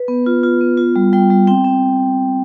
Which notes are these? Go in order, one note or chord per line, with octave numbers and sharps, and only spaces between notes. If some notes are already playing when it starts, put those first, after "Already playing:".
Already playing: B4
B3
F4
F4
B3
F4
G3
G3 G5
G3
C4 G5
C4